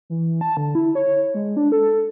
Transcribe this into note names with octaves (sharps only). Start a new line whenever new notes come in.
E3
A5
D3
E4
C#5
G#3
D4
A4